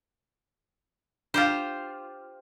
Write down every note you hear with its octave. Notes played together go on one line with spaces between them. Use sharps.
D4 F4 G4 C5 F5